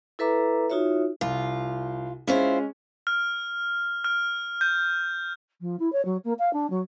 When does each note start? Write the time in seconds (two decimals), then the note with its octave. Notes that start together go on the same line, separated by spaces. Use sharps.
0.19 E4 A4 B4 E5 A#5 D6
0.70 D#4 F4 F#4 C#5 E5
1.21 C2 F4
2.27 G#3 C#4 E4 F4 C5
3.07 F6
4.04 F6
4.61 G6
5.61 F3
5.79 E4
5.92 C#5
6.05 F#3
6.24 A#3
6.39 F5
6.53 D4
6.70 F#3